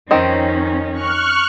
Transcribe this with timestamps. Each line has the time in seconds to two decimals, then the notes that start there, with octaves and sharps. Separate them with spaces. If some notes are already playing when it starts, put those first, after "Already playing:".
0.11 F2 D#3 C4 C#4 D#4
0.93 C#6 F6 F#6